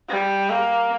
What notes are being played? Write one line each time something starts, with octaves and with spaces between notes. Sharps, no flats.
G3
A#3